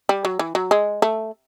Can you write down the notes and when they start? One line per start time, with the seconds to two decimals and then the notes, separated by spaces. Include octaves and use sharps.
0.09 G3
0.25 F#3
0.39 E3
0.55 F#3
0.71 G#3
1.02 A3